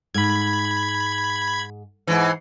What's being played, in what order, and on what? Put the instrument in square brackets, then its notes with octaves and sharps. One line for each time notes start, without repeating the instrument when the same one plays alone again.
[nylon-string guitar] G#2 [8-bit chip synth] B5 G#6
[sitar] G#2 E3